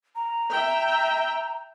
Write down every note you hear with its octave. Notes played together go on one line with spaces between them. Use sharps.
A#5
E5 G5